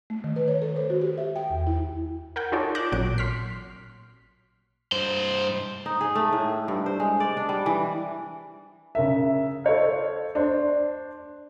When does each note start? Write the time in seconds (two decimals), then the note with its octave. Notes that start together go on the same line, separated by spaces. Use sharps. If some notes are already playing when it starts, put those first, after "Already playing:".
0.10 A3
0.24 D#3
0.36 B4
0.48 C#5
0.62 A4
0.76 C5
0.90 F#4
1.01 G4
1.18 E5
1.36 G5
1.50 E2
1.67 E4
2.36 A#4 F#5 G5
2.52 D#4 F4 G#4 A4 C#5 D5
2.75 D6 F#6 G6 A#6 E7
2.92 A1 A#2 F#3 F#6 D7
3.18 C6 F6 B6
4.92 G2 C5
5.86 D#4
6.01 G#4
6.15 A3
6.33 A2
6.68 G2
6.86 C5
7.00 G#3
7.20 D5
7.37 D4
7.49 G3
7.66 E3
8.95 C#3 A#4 E5
9.64 A4 C5 C#5 F5
10.35 D4 C5